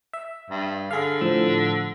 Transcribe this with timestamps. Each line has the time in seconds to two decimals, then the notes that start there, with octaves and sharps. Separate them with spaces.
0.13 E5
0.50 G2
0.91 D3 G#4 F5
1.21 A2 F3 E6